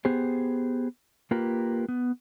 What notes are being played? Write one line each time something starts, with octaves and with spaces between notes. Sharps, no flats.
B3 G4 G#4 C5
A#3 F4 G4 A#4 B4
B3